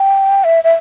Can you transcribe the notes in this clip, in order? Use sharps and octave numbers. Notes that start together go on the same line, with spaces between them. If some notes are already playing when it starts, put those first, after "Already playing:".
Already playing: G5
E5
E5